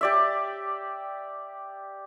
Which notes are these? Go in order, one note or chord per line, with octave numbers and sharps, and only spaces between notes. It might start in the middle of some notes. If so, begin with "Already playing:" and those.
G4 D5 E5